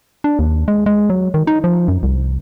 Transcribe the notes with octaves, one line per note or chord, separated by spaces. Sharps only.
D4
D#2
G#3
G#3
F#3
D#3
D#4
F3
F#2
C2